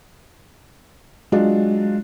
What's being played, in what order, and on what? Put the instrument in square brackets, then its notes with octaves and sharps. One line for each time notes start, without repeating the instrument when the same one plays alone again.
[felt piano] F#3 D4 F4 [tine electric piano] G#3